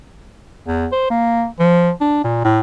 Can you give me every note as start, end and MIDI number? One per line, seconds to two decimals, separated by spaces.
0.67 0.87 40
0.92 1.08 72
1.10 1.45 58
1.60 1.90 53
2.01 2.23 62
2.24 2.42 46
2.44 2.60 45